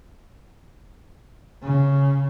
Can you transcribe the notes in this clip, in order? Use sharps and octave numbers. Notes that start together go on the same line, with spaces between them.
C#3